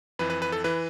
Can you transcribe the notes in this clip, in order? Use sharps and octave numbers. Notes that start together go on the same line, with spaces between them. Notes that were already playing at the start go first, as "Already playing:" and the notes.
F2 E3 B4
B4
B4
A4
E3 B4